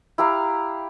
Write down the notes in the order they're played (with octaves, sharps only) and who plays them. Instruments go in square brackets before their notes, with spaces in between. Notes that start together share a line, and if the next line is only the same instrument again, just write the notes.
[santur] E4 G4 F5 A#5